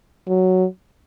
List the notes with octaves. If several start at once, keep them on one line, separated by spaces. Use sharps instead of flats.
F#3